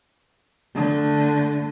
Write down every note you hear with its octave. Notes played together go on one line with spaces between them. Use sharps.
D3 A3